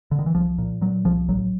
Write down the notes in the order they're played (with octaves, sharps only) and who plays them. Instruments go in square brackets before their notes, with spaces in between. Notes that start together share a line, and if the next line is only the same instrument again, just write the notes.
[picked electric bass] D3
D#3
E3
C2 F3
A#2
A#2 F#3
C2 F3
A1 F#3